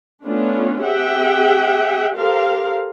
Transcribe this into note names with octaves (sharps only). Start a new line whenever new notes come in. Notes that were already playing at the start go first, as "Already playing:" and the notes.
A3 B3 C#4 D4 F4
C4 G4 G#4 E5 F#5 G5
G4 A4 A#4 C5 F5